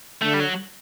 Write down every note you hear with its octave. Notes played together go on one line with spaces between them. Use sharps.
D3 A3
G3
F#3